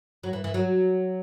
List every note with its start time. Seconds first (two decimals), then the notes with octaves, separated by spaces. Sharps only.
0.24 F#3
0.33 E3
0.44 E3
0.54 F#3